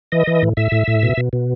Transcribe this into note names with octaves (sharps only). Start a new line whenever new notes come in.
E3 D#5
E3
A2
A2 E5
A2
A2
B2
B2
B2